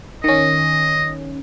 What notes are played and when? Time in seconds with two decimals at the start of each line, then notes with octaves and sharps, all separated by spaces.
0.24 D#3 C#4 D#5